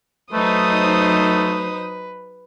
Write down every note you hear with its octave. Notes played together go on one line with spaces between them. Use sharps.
F#3 A3 D#4 B4 C5 D#6